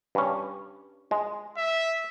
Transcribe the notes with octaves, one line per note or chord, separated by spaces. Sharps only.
G2 C#4
G#3
E5